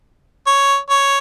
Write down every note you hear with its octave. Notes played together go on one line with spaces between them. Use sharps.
C#5
C#5